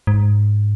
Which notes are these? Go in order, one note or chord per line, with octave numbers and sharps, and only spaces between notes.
G#2